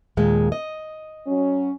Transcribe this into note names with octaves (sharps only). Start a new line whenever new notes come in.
D#2 A#2 G#3
D#5
F#3 C#4